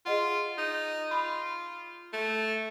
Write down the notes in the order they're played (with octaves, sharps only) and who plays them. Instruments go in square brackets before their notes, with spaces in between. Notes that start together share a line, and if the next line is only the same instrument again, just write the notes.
[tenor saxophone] F4 [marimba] G#4 D#5 F#5
[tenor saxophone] D#4
[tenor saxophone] F4 [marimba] B5
[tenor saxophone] A3